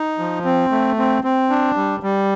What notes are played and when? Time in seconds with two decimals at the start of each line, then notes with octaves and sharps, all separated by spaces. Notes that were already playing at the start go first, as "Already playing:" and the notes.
Already playing: D#4
0.19 F3
0.45 C4
0.71 A3
0.98 C4
1.24 C4
1.50 D4
1.76 G3
2.03 G3